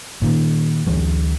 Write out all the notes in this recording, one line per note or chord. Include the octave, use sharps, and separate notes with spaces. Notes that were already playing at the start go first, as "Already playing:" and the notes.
A#2 D#3
D2 E3 F#3